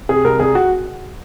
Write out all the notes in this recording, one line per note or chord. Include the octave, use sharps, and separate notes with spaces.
C3 G#4
C2 A#4
C2 G#4
F#4